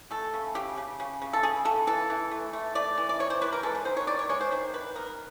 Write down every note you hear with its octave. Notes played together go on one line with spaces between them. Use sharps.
A3 A4
C#3
C#3 G4
C#3
C#3
C#3
A4
C#3 G#4
C#3 A4
E3 A4
E3
A3
A3
A3 D5
E3
D5
E3 C#5
C5
E3 B4
A#4
G#3 A4
B4
D#3 C5
C#5
D#3 D5
C#5
G#3 C#5
C5
D#3 C5
D#3 B4
B3 A#4